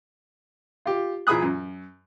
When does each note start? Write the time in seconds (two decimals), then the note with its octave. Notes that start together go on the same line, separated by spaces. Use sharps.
0.86 F4 G4
1.27 A#2 E3 G#4 B5 D#6 F#6
1.42 F#2